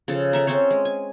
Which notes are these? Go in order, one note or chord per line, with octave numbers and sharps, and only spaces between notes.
C#3 F3 A4
A4 E5 A#5
C4 C#4 C5 C#5
G#3
G#5